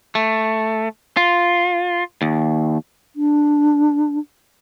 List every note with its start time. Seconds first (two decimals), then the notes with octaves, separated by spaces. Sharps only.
0.15 A3
1.17 F4
2.22 D#2
3.16 D4